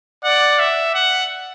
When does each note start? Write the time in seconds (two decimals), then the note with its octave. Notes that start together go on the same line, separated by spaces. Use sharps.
0.24 D5 F#5
0.59 E5
0.95 F#5